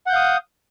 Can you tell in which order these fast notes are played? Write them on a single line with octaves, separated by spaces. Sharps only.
F#5 G6 F5 D#6